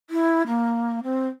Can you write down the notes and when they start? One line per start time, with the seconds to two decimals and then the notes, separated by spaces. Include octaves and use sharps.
0.10 E4
0.47 A#3
1.03 C4